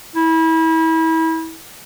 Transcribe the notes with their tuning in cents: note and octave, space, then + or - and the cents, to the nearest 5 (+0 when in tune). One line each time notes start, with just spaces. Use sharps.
E4 -30